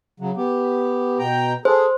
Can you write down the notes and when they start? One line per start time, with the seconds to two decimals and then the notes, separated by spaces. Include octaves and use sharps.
0.20 C#3 F#3
0.37 B3 G4
1.19 B2 G5 A#5
1.65 G#4 A4 C5